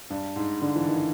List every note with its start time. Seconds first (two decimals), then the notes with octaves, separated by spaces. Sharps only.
0.10 G2
0.36 G#2
0.62 D3
0.75 E3
0.88 D#3